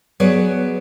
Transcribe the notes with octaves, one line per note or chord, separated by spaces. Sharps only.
F#3 B3 G#4 C#5 D5